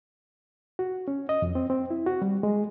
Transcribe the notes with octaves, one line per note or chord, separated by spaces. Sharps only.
F#4
C#4
D#5
F2
C4
C4
E4
F#4
G3
G#3